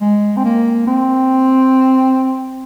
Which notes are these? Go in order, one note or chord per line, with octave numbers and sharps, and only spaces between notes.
G#3
C4
A#3
C4